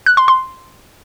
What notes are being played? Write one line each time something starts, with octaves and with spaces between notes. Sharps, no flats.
F#6
C6
C6